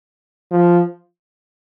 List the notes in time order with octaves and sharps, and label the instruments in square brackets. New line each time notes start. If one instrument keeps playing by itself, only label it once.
[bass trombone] F3